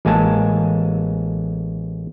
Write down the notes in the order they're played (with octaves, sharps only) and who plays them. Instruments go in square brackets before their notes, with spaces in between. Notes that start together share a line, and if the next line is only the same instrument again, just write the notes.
[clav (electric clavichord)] A1 G#3 A#3 G#5 A5